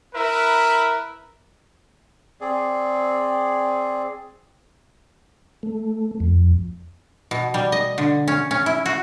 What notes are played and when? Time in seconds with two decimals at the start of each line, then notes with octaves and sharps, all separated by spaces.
0.14 E4 A#4 B4 E5
2.41 C4 G#4 D5
5.63 A3
6.20 F2
7.31 B2
7.54 G3
7.72 D#5
7.98 D3
8.28 C#4
8.51 C#4
8.66 E4
8.86 F#4